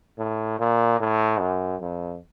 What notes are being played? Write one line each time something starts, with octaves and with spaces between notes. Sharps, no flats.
A2
A#2
A2
F#2
F2